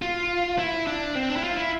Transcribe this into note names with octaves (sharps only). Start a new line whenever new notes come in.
F4
E4
D4
C4
D4
E4
F4
E4